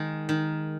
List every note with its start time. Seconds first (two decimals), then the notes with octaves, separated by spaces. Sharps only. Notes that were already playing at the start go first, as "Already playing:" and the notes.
Already playing: D#3 G#3
0.29 D#3